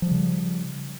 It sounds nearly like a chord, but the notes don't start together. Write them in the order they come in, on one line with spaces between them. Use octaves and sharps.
F3 G3 C#3